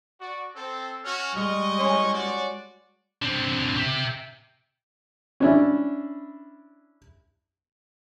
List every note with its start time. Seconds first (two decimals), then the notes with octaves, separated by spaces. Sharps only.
0.21 F#4 D5
0.56 C4 A4
1.05 C#4 F#4 F6
1.35 G3 G#3 D#5 C#6
1.79 C#5 G#5 C6
2.14 F#4 D5
3.22 D3 C4
3.77 G4 E5
5.40 C#4 D4 E4